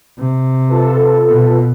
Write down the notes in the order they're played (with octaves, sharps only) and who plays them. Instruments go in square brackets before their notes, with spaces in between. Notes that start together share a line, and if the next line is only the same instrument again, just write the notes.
[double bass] C3
[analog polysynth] F4 A4 B4
[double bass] B2